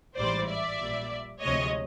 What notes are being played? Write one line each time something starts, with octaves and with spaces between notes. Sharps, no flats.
A1 G#2 E3 G3 C5 D5
D5 E5
A#1 A#2 G3
D2 C3 F3 G#3 C#5 D#5